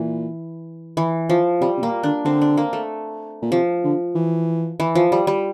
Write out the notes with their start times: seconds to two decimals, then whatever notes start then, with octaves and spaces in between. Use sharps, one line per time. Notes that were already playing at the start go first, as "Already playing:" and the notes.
Already playing: A#2 E3
0.97 E3
1.30 F3
1.61 C3 G3
1.78 C3
1.83 A#2 A#3
2.03 D3 D4
2.25 D3 C4
2.41 D4
2.57 A#3
2.73 A3
3.42 A#2
3.52 C3 F3
3.84 D3
4.15 E3
4.80 E3
4.95 F3
5.12 G3
5.27 G3